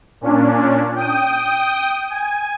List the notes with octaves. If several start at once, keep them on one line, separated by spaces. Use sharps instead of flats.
A#2 C#4 D4
G5 D#6
G#5